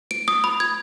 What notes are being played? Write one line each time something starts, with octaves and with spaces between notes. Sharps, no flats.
D7
D#6
B5
G#6